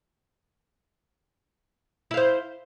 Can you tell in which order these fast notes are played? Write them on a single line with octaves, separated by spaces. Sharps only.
E4 F5 C5